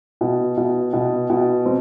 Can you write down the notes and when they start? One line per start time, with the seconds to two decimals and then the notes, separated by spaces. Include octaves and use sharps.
0.21 B2
0.57 B2
0.93 B2
1.30 B2
1.66 C4